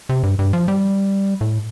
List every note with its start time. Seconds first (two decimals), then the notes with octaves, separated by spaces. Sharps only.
0.09 C3
0.23 G2
0.39 G2
0.53 F3
0.68 G3
1.41 A2